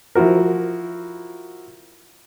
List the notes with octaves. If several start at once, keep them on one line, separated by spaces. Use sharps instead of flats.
F3 E4 F#4 A#4